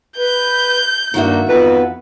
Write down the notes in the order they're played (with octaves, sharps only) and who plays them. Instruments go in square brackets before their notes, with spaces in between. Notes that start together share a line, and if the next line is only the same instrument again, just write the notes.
[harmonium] B4 [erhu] G6
[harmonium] G2 A#3 [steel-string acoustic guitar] D#3 F#4 E5
[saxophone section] F2 B4 [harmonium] B3